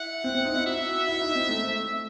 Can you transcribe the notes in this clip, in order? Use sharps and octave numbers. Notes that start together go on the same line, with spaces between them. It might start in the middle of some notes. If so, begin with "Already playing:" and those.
Already playing: E4 F#5
C4
C4
D#4
E4
F#4 E5
E4
D#4
C4
A3
A3